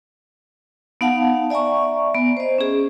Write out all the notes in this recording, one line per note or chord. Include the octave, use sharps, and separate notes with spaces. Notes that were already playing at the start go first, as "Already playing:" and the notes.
B3 D#4 F5 F#5 A5
D5 E5 G#5 A#5 C#6
B3
C5 D#5
C#4 G#4